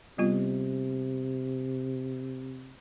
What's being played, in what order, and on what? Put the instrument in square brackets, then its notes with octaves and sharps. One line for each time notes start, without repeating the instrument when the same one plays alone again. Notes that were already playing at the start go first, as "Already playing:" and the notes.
[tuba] C3 [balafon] G3 B3 F4